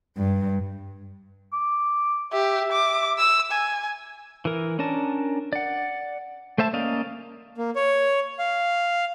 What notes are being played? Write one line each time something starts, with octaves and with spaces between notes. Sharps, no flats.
G2
D6
G4 E5
D6
E6
G#5
E3 A#4
C#4 D4 A#4 A5
D5 F#5
A3 C5 E5 A5
A#3 C#4 D5 D#5 F5
A#3
C#5
F5